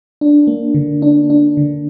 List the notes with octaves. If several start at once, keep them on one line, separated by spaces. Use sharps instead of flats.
D4
A#3
D3
D4
D4
D3